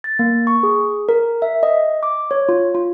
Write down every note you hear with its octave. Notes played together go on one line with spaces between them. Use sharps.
A6
A#3
C#6
G#4
A#4
E5
D#5
D6
C#5
F4
F4